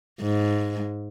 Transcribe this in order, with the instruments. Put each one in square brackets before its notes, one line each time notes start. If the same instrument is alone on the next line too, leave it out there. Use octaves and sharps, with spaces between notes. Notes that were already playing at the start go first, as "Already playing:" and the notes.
[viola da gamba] G#2